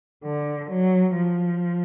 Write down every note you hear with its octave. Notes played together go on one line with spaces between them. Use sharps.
D3
F#3
F3